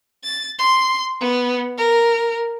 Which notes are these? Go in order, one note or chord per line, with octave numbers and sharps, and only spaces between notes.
A6
C6
B3
A#4